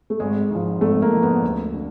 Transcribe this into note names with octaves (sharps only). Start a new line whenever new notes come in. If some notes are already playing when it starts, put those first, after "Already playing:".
A3
G#1 G#3
G#2 F3
G#1 A3
A#3
G#2 F3
B3
D2
D3